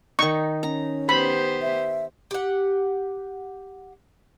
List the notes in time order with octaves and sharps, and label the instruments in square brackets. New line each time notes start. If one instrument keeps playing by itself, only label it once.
[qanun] D#3 D#4 [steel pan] C#6
[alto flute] C#4 [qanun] A#5
[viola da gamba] B3 G4 C5 [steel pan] B5
[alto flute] E5
[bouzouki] G4 F#5